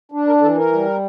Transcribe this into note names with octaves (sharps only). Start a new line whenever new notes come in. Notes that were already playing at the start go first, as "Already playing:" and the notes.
D4
A#4
E3 A4
A#4
G3